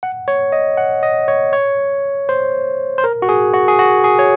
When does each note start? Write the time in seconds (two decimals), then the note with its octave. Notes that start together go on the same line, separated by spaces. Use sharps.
0.03 F#5
0.28 C#5
0.52 D#5
0.77 F#5
1.03 D#5
1.28 C#5
1.53 C#5
2.29 C5
2.98 C5
3.04 A#4
3.22 F#4
3.29 G#4
3.54 F#4
3.68 G#4
3.79 F#4
4.04 G#4
4.19 C#5